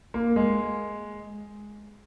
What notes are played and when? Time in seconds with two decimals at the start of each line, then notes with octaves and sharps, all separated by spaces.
0.14 A#3
0.36 G#3